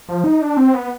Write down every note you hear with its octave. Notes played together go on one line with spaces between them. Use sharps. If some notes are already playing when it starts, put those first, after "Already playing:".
F3
D#4
D4
C4
B3